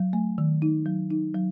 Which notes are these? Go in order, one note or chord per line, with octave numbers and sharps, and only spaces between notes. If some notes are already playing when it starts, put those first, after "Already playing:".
Already playing: F#3
A3
D#3
D#4
F#3
D#4
F#3